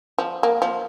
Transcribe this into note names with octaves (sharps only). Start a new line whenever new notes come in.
F3
A#3
F3